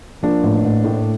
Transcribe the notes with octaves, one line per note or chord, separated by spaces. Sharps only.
F3 A#3 D4
A1
A1
A2